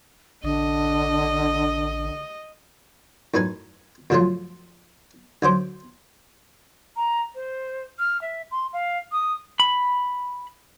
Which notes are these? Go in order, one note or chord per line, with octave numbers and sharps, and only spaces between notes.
A1 D3 D4 D#5
F#2 A2 D#4 B4 G#5
F#2 C#3 F3 F#3 A3 F4
D2 F#3 C5 D6
A#5
C5
F6
E5
C6
F5
D#6
B5